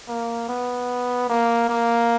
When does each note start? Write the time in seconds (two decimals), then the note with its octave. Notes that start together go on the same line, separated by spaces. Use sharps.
0.08 A#3
0.49 B3
1.29 A#3
1.69 A#3